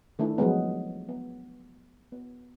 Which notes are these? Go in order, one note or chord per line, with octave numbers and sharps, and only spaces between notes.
D#3 A3 D4 E4
F3 F#3 G#3 B3
B3
B3